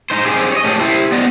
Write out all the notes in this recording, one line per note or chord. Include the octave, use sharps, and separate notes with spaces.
D#4 C5
C4 D#4 G4 G#4
C#5 D#5
A3 C#4 G4 A4
E4 G4 C5
B3 D5 D#5